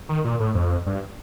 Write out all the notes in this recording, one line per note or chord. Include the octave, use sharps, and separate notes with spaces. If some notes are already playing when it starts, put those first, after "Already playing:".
D#3
A#2
A2
F2
G2